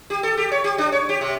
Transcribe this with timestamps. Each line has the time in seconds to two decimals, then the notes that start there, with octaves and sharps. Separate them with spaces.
0.10 G4
0.23 A4
0.37 G4
0.52 C#5
0.64 G4
0.78 D4
0.92 C#5
1.09 G4
1.21 C3